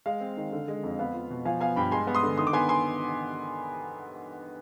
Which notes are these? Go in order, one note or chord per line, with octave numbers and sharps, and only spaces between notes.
G#3 F5
C4
D#3
D3
G#3
F2
B3 F5
F4
B2
F3 F5 G#5
B3 F5 G#5
G2 G5 B5
G#3 G#5 C6
B3
C6 D#6
D3
D#3 C6 D#6
D6
B3 G#5 C6
G#5 C6